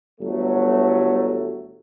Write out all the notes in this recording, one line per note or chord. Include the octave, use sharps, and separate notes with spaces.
G1 F#3 A3